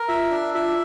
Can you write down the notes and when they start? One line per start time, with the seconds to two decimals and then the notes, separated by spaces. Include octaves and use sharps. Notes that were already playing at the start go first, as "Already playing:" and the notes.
Already playing: A#4
0.08 F4 E5
0.31 D4
0.54 F4 E5